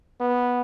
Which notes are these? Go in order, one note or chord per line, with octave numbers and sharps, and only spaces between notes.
B3